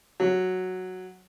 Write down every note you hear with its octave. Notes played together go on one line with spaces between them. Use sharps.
F#3